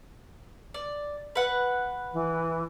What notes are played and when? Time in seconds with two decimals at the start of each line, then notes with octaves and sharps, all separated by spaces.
0.74 D5
1.35 B4 F#5
2.13 E3